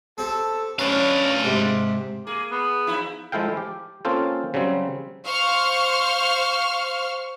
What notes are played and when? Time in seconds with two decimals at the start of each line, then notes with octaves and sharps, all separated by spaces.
0.18 C4 G4 A4
0.79 C#4 D4 B4 F5
1.44 G#2 C3
2.27 A#3 G#4
2.52 B3
2.87 F3 D#4 E4
3.32 F3 G#3 E4 A4 F5 G5
3.57 G4
4.05 A#3 C4 C#4 F4 A4 C5
4.54 C#3 F#3 G3 C4
5.25 C5 F5 C#6 F6